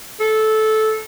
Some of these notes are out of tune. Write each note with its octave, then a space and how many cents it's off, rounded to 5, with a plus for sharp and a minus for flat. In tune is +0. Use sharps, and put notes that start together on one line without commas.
A4 -15